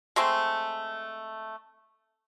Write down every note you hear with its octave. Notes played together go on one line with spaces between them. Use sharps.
G#3 A3 C4